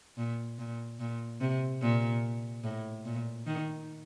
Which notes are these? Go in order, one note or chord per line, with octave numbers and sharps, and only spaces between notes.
A#2
A#2
A#2
C3
A#2
A2
A#2
D#3